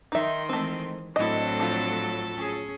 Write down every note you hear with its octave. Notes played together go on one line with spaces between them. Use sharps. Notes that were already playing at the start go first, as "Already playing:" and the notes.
D#3 D#4 E5 C6
E3 G#3 A3 C4
A2 F#3 C4 D4 E4 A4 D#5
F3 F4
C#4 G#4